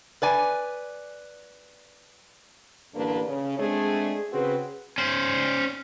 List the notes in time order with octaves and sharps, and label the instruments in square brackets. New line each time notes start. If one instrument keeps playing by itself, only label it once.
[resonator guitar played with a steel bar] B4 D5 G#5
[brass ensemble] A1 G2 D3 A#3 D4 B4
C#3
G#3 A3 C4 D4 G#4
C#3 C4 F#4 G#4 B4
[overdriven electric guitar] C#4 C5